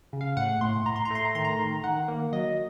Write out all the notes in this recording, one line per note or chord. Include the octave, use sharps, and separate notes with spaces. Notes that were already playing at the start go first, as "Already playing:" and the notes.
C#3
F5
A2 F#5
A2 C6
A2 A#5
C6
A#5
A3 C6
A#5
D#3 C6
A#5
D#3
D#3 F#5
A#3
F#3 D#5